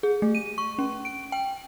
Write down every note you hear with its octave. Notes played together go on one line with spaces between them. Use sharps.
G#4
A3
D#7
C#6
C#4
D7
G5